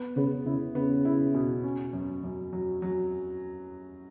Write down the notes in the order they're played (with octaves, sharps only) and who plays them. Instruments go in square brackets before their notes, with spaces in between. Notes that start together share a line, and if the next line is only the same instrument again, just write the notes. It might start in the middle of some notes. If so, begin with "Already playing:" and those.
Already playing: [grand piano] B3
[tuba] C#3 [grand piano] B3
[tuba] C#3 [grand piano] E4
[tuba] C#3 [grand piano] B3
[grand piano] E4
B2
C#4
F#2
F#2
F#3
F#3